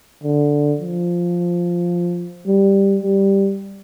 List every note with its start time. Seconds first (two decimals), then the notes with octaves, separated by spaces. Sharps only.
0.24 D3
0.80 F3
2.47 G3
3.02 G3